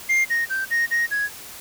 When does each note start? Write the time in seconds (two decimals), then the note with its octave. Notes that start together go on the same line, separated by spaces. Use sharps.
0.09 C7
0.30 A#6
0.50 G6
0.71 A#6
0.91 A#6
1.11 G#6